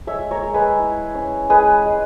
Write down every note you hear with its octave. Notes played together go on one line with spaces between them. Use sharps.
G#3 C#5 E5
A#4 C#5
G#3
G#4 B4
E4
C#4
G#3 G#4 B4
G#3